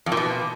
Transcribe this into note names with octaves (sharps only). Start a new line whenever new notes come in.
F2
A#2
B2